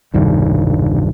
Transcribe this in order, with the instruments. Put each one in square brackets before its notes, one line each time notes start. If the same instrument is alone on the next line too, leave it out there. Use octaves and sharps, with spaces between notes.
[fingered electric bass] E1 C2 G2 D#3